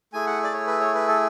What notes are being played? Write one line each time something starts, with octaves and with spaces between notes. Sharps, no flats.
A3 E4 G#4 G#5
F#5
D5
C#5
B4
C#5
B4
A4